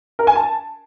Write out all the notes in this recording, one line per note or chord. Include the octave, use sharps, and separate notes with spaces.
A#4
G#5
A5